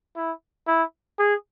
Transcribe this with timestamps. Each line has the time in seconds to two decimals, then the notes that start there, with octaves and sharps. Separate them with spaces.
0.16 E4
0.68 E4
1.19 G#4